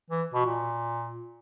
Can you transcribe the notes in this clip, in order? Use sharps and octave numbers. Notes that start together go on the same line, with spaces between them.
E3
B2
A#2